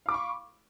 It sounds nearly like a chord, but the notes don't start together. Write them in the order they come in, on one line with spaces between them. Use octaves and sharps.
F5 D6 B5 C#6